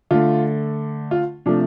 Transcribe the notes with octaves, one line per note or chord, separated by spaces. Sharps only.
D3 A3 F4
F4
C3 F3 A3 D4